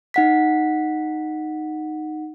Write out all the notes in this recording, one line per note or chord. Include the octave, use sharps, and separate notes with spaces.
D#4 F#5 B6